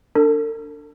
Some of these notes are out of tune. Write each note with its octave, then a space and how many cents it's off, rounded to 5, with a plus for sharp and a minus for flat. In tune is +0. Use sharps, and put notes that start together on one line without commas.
D4 +0 A4 +45